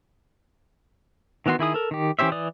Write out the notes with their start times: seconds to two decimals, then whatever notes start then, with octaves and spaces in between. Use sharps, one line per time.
1.46 D#3 E3 B3 F#4 C6
1.59 D#3 E4 G#4 D#6
1.74 A4 A#4
1.91 D#3 G4
2.19 E3 C#4 G4 C5 E5
2.32 E3 D5 D#6